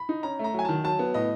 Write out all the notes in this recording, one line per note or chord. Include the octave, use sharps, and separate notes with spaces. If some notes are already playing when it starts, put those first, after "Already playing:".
Already playing: B5
D#4
C#4 A#5
A3
A#5
F#3 G#5
D#3 A5
F#3 A5
B3
A2 D#5